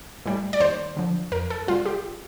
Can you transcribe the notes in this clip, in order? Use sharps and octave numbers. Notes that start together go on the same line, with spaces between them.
A2 G3
D5
D#2 C5
D3 F3
F2 A#4
A4
C3 G3 F4
G4